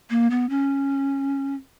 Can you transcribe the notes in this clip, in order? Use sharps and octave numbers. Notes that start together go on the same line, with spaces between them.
A#3
B3
C#4